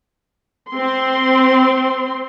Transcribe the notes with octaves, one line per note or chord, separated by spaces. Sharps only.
C4 C6